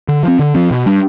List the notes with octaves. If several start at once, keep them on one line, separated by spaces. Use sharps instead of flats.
D3
F3 C4
D3
F3 C4
B2
G3 D4